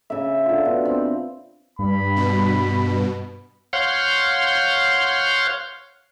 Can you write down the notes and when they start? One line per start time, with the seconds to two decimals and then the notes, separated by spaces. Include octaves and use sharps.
0.10 C#3 E5
0.46 D3 F4
0.65 B2
0.85 C4
1.79 G2 B5
2.16 B2
3.73 C#5 F5 F#5 C6 G6